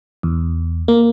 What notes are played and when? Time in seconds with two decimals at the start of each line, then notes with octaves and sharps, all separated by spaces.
0.23 E2
0.88 A#3